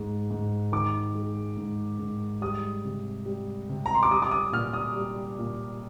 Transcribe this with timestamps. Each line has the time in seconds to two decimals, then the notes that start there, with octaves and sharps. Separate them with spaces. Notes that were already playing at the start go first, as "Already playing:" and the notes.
Already playing: G#2 G#3
0.30 G#2
0.72 D#3 D6
1.15 G#3
1.57 G#2
1.99 G#2
2.41 G3 D#6
2.84 C3
3.25 G3
3.69 C3
3.86 A#5
3.95 C6
4.03 D6
4.10 G3 D#6
4.22 D6
4.31 D#6
4.52 A#2 F6
4.73 D#6
4.95 G3
5.38 A#2